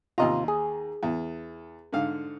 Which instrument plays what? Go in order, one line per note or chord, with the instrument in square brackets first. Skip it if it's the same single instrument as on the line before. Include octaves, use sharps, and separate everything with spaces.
[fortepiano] D#2 D#5 A#5 [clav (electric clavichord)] C3 F4
[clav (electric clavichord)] G#4
[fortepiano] E2
G#2 D3 F5